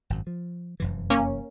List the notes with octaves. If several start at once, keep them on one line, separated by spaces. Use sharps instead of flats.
G#1 F#2
F3
F1 F#2 E3
A#3 C#4